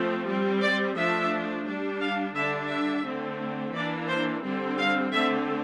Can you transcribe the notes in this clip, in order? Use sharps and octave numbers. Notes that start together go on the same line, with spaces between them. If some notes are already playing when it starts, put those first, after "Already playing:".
Already playing: F3 A3 C4
G3 C4
D5
F3 A3 D4 E5
G3 D4
F5
D3 G3 D4 E5
E5
D3 A3 C4
E3 A#3 D4 D5
C5
D3 G3 C4
F5
D3 A3 C4 E5